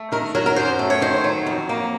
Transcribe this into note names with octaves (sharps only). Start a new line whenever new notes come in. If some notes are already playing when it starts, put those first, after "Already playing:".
Already playing: A3
D#3 A#4
F#3 A#4
A#4
F#2 C5
A3
C#5
D#3 C5
F#3
F2
A#3